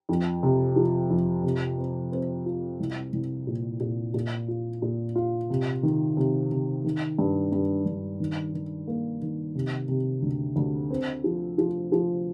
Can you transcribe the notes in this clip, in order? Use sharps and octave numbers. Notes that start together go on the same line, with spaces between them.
F2
C3
F3
F2
C3
C4
C4
F4
C2
C2
A#2
A#2
A#2
F4
A#2
F4
C3
D#3
C3
C3
D#3
G2
G2
G2
D#3
D#3
A#3
D#3
C3
C3
D2
D2
C4
F3
F3
F3